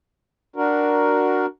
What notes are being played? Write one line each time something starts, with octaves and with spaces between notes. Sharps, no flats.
D4 F#4 A#4